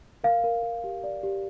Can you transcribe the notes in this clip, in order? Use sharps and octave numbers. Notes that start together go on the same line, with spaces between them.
A#4 F5
A#4
A#4
G4
D5
G4